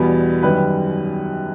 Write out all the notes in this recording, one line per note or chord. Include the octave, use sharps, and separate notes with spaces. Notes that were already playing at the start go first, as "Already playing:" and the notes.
Already playing: E2 B2 G3 B3
F#2 D#3 G3 B4